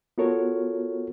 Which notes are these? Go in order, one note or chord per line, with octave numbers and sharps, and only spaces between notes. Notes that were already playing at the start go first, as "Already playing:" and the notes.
B3 F4 F#4 A4 A#4 C#5